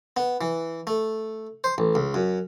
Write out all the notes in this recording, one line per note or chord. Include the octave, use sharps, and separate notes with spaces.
B3
E3
A3
C5
A1
C#2
F#2